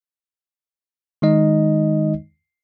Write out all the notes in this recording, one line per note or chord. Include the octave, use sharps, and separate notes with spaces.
D#3 G#3 D#4 D#5